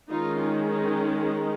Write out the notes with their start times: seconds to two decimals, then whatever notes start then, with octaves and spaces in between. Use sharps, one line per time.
0.11 D#3 G#3 C#4 D#4 F4
0.40 D#4
0.69 D#4
1.26 D#4